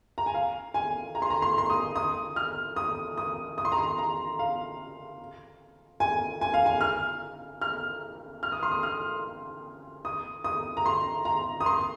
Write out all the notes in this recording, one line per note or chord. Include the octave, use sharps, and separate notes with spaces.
A#5
G#5
F5
G#5
A#5
C6
A#5
C6
C6
D#6
D#6
F6
D#6
D#6
D#6
C6
A#5
C6
A#5
F5
G#5
G#5
F5
G#5
F6
F6
F6
D#6
C6
D#6
F6
D#6
D#6
A#5
C6
A#5
D#6
C6